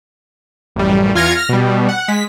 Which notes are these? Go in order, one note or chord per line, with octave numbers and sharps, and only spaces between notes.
A1 F#2 G3
E2 F4 F6 G#6 A#6 C#7
F6 A#6
B2 G3
F#5
G#3 B6